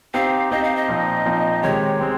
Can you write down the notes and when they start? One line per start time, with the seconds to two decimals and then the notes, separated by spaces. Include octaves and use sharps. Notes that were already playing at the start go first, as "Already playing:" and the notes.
0.14 C4 D#4 G4 C5 F5
0.51 C4 D#4 G4 C5 D#5
0.64 F5
0.76 D#5
0.88 A#2 F3 C4 D#4
1.25 A#2 F3 C4 D#4
1.63 D#3 G#3 C4 G4 C#5
1.99 G#3 C4 G4